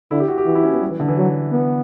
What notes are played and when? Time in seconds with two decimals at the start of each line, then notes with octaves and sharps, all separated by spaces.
0.11 D3 E4
0.20 G4
0.28 F#4
0.38 G4
0.46 E3 F#4
0.55 E4
0.64 C#4
0.73 B3
0.81 G3
0.90 E3
1.00 D3
1.08 E3
1.17 F#3
1.52 B3